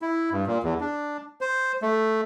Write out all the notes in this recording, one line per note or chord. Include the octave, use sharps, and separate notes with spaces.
E4
G2
A#2
E2
D4
C5
A3